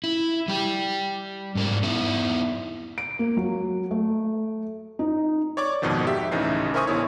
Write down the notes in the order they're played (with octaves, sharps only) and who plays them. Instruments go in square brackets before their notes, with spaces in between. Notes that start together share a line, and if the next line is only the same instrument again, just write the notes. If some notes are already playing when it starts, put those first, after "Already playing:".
[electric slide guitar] E4
G3 G4
G#2 A#4 D5
B3 D#4 E4 E5
[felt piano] D7
A#3
F#3
A3
D#4
[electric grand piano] C#5 D5 C#6 D6
F2 G#2 B2 D#3 F3
G4 E5
A1 D2 C#3 E3 D#4 C7
A#4 C5 E5 G#5 C#6 D#6
A1 D3 B3 E4 C#5